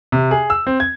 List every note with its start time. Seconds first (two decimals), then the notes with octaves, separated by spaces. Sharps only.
0.12 C3
0.31 G#4
0.50 E6
0.67 C4
0.80 G#6